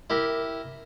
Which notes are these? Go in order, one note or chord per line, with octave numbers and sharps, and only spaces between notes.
E4 G4 A#4